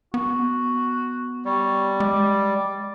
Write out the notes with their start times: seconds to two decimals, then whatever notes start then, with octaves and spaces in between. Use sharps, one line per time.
0.14 B3 F#4
1.45 G3 C#5
2.00 G#3 D5